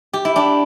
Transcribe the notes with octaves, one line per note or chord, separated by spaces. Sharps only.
G4
E4
D4 G4